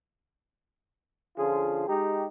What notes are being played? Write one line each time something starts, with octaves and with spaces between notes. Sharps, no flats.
D3 F3 C#4 F4 G#4
G#3 D#4 G4